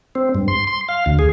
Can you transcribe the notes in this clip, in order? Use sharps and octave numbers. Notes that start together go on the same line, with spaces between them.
C4
G2
C6
C6
F5
D2
G#4